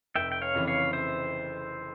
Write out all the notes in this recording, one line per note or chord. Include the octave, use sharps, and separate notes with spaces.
F1 E5 G5
G5
C#5 F5
F2 C#3 E3
C#5 F5
C5 E5